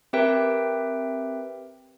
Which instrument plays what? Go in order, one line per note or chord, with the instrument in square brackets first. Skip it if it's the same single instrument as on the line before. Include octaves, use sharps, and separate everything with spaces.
[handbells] C4 G4 A#4 B4 E5 G5